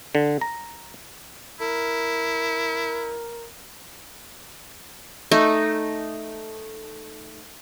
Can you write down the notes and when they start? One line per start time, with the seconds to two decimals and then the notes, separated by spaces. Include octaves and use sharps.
0.15 D3
0.41 A#5
1.61 E4 A#4
5.31 A3 D#4